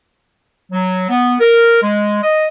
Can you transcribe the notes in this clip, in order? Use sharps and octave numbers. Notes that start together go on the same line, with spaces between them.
F#3
B3
A#4
G#3
D#5